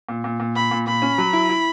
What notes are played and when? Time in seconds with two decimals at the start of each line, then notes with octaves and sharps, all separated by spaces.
0.09 A#2
0.24 A#2
0.40 A#2
0.56 A#2 B5
0.71 A#2
0.87 A#2 B5
1.02 C#4
1.18 F#3
1.33 E4
1.49 E4